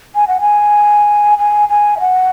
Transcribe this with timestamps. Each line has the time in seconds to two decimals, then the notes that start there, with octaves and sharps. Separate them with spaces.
0.15 G#5
0.28 F#5
0.41 G#5
1.38 G#5
1.69 G#5
1.97 E5
2.00 F#5